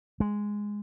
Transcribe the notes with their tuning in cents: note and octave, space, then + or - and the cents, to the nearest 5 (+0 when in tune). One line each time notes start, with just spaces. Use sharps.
G#3 -5